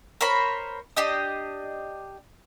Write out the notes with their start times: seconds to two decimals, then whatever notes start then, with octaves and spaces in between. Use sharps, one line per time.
0.21 A#4 C5 C#5 B5
0.97 D4 G4 D#5